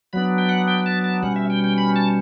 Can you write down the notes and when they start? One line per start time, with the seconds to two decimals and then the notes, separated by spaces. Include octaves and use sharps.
0.13 F#3 B3 D4 B5
0.38 G5
0.49 F#5
0.68 G5
0.86 A5
1.04 A5
1.22 B2 G3 C#4 F#5
1.36 E5
1.50 G5
1.64 G5
1.78 B5
1.96 A5